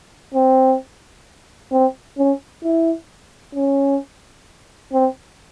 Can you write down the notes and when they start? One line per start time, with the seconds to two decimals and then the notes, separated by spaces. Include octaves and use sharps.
0.35 C4
1.72 C4
2.18 C#4
2.64 E4
3.55 C#4
4.93 C4